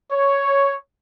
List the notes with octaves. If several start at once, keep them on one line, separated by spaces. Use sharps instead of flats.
C#5